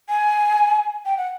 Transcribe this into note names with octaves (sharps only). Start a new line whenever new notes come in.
G#5
G5
F#5